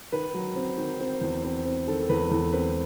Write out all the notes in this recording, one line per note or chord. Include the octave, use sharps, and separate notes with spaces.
D#3 B4
F#3
C4
D#3
C4
E2
C4
C4
D#3 A4
E2 B4
E2 A4
C4 B4